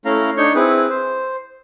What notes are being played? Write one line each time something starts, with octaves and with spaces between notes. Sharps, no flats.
A3 C#4 E4 F5 A#5
D4 D#4 C#5 C#6 G6
C4 E4 G#4 B4
C5